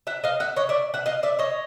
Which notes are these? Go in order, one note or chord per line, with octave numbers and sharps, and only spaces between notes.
E5 F#5
D#5 F5
E5 F#5
C#5 D#5
D5 E5
E5 F#5
D#5 F5
D5 E5
C#5 D#5